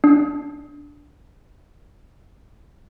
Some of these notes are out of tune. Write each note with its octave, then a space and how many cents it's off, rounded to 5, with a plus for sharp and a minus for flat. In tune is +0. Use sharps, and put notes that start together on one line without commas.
D4 -5